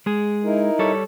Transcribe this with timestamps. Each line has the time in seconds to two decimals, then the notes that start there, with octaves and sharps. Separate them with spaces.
0.06 G#3 G#4
0.44 D#4 E4 A#4
0.79 G3 A4 C#5